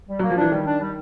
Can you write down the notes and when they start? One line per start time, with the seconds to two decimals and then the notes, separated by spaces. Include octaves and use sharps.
0.09 G3
0.19 F#3 A#3
0.30 F3
0.37 E3 D4
0.52 D#3 G3
0.66 D4
0.81 G3